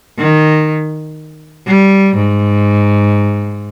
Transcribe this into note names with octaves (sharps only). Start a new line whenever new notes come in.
D#3
G3
G#2